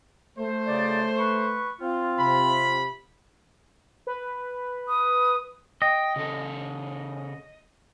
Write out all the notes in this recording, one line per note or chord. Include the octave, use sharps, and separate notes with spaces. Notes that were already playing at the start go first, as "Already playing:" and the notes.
A3 C5
F#2 C#3 D5
B4 C#6
C4 F4
C3 B5
B4
D#6
D#5 G5
C#3 A4